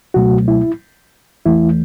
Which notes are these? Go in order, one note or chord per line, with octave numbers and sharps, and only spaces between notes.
C#2 B2 F#3 A3 F#4
E4
E2 E3 A3 E4